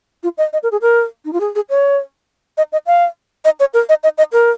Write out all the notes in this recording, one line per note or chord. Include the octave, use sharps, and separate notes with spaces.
F4
D#5
D#5
A#4
G#4
A#4
D#4
F4
G#4
G#4
C#5
D#5
D#5
F5
D#5
C#5
A#4
D#5
D#5
D#5
A#4